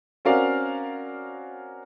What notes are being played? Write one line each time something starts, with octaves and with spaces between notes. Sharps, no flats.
C4 C#4 F#4 A#4 D5 F5